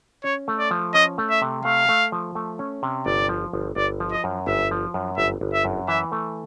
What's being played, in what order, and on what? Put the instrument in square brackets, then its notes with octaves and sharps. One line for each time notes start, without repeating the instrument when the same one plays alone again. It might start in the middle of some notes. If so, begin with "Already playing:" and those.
[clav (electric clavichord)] C#4 [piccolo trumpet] C#5
[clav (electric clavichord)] A3
[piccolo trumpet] D5
[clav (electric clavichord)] F3
[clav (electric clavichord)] C#4 [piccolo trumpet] D#5
[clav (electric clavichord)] A3
[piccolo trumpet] E5
[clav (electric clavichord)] C3
[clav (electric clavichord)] A3 [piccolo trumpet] F5
[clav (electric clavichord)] A3
F3
A3
C#4
C3
[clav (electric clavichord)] G1 [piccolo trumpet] D5
[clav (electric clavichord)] F3
G1
[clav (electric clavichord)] G1 [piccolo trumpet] D5
[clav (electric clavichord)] F3
[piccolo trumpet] D#5
[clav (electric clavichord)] F#2
[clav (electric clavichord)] G1 [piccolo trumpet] E5
[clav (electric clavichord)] F3
F#2
[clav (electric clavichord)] G1 [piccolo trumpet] E5
[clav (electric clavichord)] G1
[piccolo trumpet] E5
[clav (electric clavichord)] F#2
[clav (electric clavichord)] E3 [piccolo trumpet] E5
[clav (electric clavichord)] A3